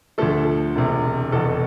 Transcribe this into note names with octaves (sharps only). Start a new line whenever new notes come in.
D2 D3 F3 A3 A4
E1 E2 C3
F1 E2 B2 A4